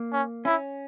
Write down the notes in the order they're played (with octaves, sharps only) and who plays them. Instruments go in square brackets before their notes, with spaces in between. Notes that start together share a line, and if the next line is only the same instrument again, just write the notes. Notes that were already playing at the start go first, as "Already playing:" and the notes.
Already playing: [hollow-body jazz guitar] A#3
[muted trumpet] C#4
[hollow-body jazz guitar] C#4 [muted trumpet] E4